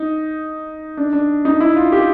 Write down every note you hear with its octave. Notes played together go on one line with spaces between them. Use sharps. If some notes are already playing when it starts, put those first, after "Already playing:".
Already playing: D#4
D4
D4
D#4
E4
F4
G4